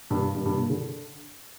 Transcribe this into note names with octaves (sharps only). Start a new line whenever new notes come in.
G2
G2
G2
A#2
D3